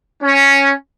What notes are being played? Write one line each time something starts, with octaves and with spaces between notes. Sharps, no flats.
C#4